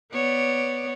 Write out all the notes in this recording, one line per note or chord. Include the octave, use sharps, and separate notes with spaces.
B3 C#5 D5